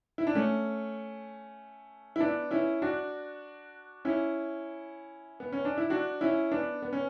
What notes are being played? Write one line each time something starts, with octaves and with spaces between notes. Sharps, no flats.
E4
D4
A3 C#4
E4
B3 D4
C#4 E4
D4 F#4
C#4 E4
B3
C#4
D4
E4
D4 F#4
C#4 E4
B3 D4
B3
C#4